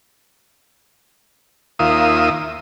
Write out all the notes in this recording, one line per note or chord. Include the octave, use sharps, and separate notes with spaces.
D#2 A#3 F4 E5 D#6